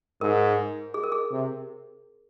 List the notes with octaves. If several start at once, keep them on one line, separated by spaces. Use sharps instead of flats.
G#2 A#4
G#4
A#4
G#4
C3